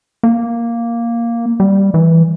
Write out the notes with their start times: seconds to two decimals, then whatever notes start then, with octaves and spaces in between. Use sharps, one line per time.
0.23 A#3
1.60 G3
1.94 E3